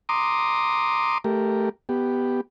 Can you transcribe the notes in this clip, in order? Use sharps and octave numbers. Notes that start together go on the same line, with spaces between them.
A#5 C6 D6 D#6
A3 G4 A#4
B3 G4